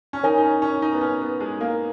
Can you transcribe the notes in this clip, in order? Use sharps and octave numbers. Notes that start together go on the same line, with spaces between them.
C#4
D#4 A#4 C#5 G#5
D#4
C#4
C#4
D#4
B3
C#4
B3
G#3
A#3